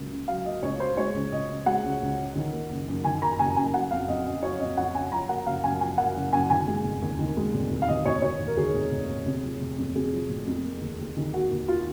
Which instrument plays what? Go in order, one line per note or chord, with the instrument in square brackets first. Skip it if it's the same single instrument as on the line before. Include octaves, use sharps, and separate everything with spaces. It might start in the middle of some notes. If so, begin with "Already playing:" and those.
Already playing: [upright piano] C#2 F#3 A#3
C#3
F#3 F5
A#3 D#5
C#2 C#5
C#3 C5
G#3 C#5
C#2
C#2 D#5
C#3
G#3 F#5
C#2
C#2
C#3
D#3
A#3
F#1
F#2
D#3 G#5
A#3 A#5
F#1 G#5
F#2 G#5
F#3 F#5
F2 F5
F2 D#5
C#3 D#5
F#3 C#5
F2 D#5
F2 F#5
C#3 G#5
F3 A#5
A#3 F#5
F#1 F5
F#2 G#5
F3 G#5
A#3 F#5
F#1
F#2 G#5
D#3 G#5
G#3
F1
D#2
D#3
G#3
F1
D#2
F5
D#3 D#5
F1 C#5
F1 C#5
D#2
A#4
D#3 G#4
F1
F1
D#2
C3
F3
F1
F2
C3 G#4
F3
F1
F2
A#3
D#2
D#2
D#3
A#3 F#4
D#2
F4